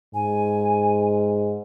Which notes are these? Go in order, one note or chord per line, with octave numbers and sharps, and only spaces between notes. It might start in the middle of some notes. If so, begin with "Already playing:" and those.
G#2 G#5